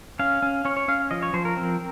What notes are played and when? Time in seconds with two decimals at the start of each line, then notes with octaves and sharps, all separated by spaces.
0.19 C#4 F5
0.42 C#4
0.65 C#4 C#5
0.77 C#5
0.88 C#4 F5
1.11 F3 D#5
1.23 C#5
1.33 F3 C5
1.45 A#4
1.56 C4